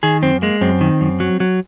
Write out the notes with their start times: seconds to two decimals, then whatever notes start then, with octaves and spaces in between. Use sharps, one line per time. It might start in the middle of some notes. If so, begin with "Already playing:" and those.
0.03 D#3 G#4
0.22 F#2 C4
0.42 G#3 A#3
0.61 F#2 C4
0.81 D#3
1.01 F#2
1.20 F#3
1.40 F#3